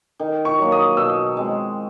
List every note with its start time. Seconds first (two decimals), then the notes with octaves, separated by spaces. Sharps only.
0.19 D#3
0.45 C#6
0.59 F#3 A#3
0.72 D#6
0.97 B2 E6
1.37 G#3 C4